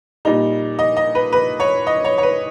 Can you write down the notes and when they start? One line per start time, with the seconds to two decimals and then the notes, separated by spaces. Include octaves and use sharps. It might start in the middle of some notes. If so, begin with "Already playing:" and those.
0.25 A#2 G3 D#4
0.79 D#5
0.97 D#5
1.15 B4
1.32 B4
1.60 C#5
1.87 D#5
2.04 C#5
2.18 C#5
2.23 B4